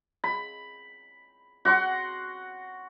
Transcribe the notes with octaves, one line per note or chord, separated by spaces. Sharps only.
B5
F#4 F#5 C6